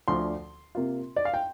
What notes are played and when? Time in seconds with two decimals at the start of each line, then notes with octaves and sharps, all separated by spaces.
0.08 D2 D3 F3 C6
0.75 C3 A#3 F4
1.16 D5
1.25 F5
1.34 G5